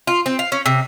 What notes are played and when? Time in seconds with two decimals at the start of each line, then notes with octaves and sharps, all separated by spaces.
0.07 F4
0.26 C4
0.39 F5
0.52 C#4
0.66 C3